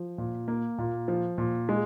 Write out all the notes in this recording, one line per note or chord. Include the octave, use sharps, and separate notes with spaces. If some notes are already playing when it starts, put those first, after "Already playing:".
Already playing: F3
A#2
A#3
A#2
F3
A#2
G#3